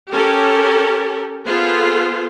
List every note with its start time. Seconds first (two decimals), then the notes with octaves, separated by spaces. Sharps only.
0.12 C#4 G4 A4 A#4
1.45 B3 F4 G#4 A4 C5